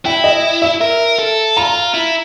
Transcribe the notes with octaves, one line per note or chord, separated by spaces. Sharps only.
E4 G5
D#5
E5
A#4
A4
F4 A#5
E4